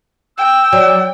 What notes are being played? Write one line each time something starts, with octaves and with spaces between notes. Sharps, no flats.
G5 E6
F#3 D5